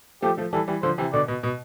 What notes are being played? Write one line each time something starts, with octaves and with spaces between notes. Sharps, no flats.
F3 A3 G4
F3 A3
E3 G3 A4
E3 G3
D3 F3 C5
C3 E3
B2 D3 D5
B2
B2